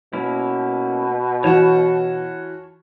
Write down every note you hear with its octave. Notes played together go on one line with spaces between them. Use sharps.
B2 A#3 C#4 E4
E3 F4 F#4 C#5 A5 C#6